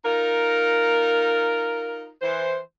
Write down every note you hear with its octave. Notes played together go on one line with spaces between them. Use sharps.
D#4 F4 A#4
E3 C5